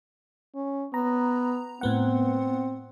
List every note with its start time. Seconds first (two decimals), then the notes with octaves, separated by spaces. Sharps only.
0.55 C#4
0.94 B3 A#5
1.81 A2 B3 C4 F#5